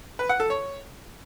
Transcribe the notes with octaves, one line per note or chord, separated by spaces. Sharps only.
B4
F#5
A4
C#5